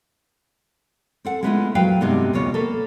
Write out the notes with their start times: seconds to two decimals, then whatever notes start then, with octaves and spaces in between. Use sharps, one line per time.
1.25 C4 A4 F#5
1.43 G#3 A3 B3 C#4 E4 F4
1.75 A#2 F#3 B4 C5 F5 G5
2.01 G2 C3 G#3 B3 D#4
2.33 D2 B2 G3 B3 F4 C#5
2.54 A#3 A4 B4